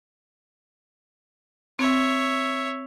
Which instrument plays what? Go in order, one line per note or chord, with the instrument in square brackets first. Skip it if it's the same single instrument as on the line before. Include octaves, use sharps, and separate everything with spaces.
[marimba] C4 [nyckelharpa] C#5 E5